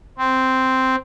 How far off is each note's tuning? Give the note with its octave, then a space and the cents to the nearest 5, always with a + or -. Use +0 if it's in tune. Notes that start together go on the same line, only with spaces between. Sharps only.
C4 -5